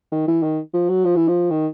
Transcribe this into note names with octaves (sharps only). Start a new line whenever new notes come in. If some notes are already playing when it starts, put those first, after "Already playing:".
D#3
E3
D#3
F3
F#3
F3
E3
F3
D#3